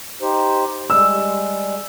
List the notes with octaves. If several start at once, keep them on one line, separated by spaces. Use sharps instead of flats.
D#4 G4 C5
G3 G#3 E6